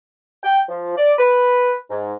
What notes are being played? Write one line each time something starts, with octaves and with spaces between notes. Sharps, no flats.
G5
F3
D5
B4
G#2